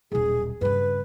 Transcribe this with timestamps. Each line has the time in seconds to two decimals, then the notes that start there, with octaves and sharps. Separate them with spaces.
0.12 D#1 B1 G#4
0.61 G2 C#3 B4